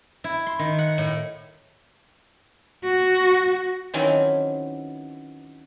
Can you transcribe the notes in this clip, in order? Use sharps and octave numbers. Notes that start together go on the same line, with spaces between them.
E4
C6
D#3
F#5
A2
F#4
D#3 E3 F#3 C4 C#4